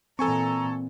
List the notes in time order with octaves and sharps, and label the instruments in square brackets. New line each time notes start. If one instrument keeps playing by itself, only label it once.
[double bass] A#2 E3 [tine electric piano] C4 [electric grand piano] A4 G#5 C#6 [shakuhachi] A#5